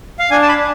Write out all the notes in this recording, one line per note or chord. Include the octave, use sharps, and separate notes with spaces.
F5
D4 G#5
A5
B5
D4